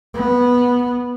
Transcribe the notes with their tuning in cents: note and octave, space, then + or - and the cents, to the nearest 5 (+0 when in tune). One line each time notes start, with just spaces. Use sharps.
B3 -10